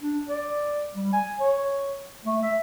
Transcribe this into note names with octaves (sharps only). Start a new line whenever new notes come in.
D4
D5
G3
G#5
C#5
A3
E5